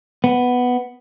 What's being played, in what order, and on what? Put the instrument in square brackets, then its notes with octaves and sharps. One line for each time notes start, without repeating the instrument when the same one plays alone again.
[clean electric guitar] B3